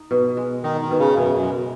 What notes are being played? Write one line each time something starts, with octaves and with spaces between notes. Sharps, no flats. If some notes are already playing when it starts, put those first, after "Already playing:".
Already playing: D#4
B2
G#3
D#3 D#4
D#3
B2
C#3
F#2 B2
F#2
G#3